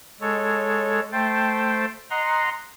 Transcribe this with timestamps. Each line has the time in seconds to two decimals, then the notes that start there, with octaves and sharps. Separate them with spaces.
0.21 G#3 A4 C#5
1.12 A3 C5 G5 A5
2.10 D#5 F#5 A#5 C6